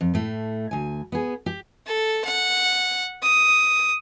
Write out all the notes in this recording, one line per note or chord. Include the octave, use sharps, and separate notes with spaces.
F2
A2 A3
D2 G#5
B3 G#4
G4
A4
F#5
D#6